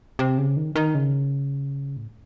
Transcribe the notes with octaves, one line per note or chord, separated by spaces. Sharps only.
C3
C#3
D#3
D#3
C#3
A2